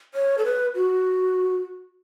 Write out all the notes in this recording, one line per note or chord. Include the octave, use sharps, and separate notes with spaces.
C#5
A4
B4
F#4